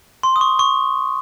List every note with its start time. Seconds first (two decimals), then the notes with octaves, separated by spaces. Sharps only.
0.23 C6
0.36 D#6
0.41 C#6
0.59 C#6